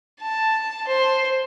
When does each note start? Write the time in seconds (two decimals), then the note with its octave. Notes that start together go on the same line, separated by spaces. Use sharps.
0.22 A5
0.88 C5